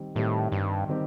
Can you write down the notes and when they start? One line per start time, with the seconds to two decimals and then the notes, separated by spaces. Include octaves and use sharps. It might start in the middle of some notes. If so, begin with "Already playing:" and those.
Already playing: D#3 G3 C4 G4
0.15 A2 D#3 G3 C4 G4
0.52 G2
0.89 D#3 G3 C4 G4